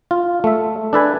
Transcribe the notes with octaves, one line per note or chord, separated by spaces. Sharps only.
F4
A3 E5
D4 A4 B4 G#5